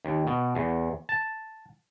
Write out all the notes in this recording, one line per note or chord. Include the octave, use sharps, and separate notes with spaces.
D#2
B2
E2
A5